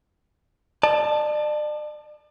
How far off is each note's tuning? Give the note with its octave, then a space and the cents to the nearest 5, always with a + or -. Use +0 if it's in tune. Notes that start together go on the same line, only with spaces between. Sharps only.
D5 +40 A5 +0